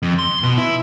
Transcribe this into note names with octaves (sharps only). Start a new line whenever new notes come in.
F2
C6
B2
E4